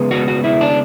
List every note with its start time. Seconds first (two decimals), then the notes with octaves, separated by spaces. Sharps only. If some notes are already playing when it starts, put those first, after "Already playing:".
Already playing: C#3 G#3 B3
0.11 F#4
0.28 F#4
0.44 E4
0.61 D4